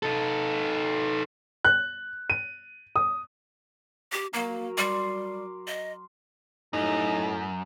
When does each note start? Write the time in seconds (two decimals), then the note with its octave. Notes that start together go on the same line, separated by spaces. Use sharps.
0.03 D#4 A4
1.65 F#6
2.30 D#7
2.96 D#6
4.12 G4
4.33 F#3 A#3 A#4
4.78 G3 C6 D6
5.67 D#5
6.73 F#2 A2 D#4